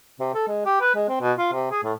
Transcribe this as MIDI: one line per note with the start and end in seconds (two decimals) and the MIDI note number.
0.20 0.30 48
0.34 0.44 69
0.47 0.63 56
0.66 0.81 67
0.81 0.92 71
0.95 1.04 56
1.09 1.18 60
1.21 1.32 47
1.38 1.51 65
1.52 1.67 48
1.71 1.82 68
1.83 1.93 45